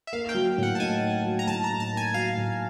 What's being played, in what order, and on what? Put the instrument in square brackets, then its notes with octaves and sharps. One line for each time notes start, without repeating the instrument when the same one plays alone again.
[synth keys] E5
[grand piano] A#3 [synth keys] F5
[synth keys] G5
[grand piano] F#3
[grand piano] A2 [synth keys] F#5
[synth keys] A5
[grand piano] D#4 [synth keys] G#5
[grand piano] A#3
F#3
[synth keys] A#5
[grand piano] A2 [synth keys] A5
[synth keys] A#5
[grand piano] D#4
[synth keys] A5
[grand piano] A#3 [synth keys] G#5
[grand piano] F#3 [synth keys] F5
[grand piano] A2